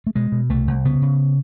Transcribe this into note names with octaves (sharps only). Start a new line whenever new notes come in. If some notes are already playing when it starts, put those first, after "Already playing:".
A3
B2 G#3
B2
C2 A3
C2
C#3 B3
C#3